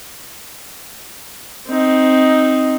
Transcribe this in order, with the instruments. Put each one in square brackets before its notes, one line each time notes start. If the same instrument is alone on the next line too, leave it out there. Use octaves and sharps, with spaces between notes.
[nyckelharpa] C4 D#4